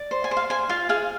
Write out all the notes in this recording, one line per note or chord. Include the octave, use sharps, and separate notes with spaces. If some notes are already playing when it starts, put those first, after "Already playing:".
Already playing: D5
C5
G#5
C5
F5
C5 G#5
F4 F5
G#4 F5